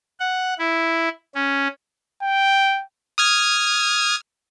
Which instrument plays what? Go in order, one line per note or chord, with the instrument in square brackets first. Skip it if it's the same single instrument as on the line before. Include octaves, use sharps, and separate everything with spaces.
[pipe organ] F#5
E4
C#4
[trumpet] G5
[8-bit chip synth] D#6 F6 G#6